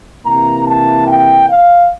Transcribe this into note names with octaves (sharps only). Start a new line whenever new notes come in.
C3 E3 A#3 E4 A#5
A5
G5
F5